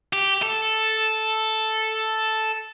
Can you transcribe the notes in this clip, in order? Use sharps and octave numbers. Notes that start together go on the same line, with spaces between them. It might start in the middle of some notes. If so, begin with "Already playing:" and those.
G4
A4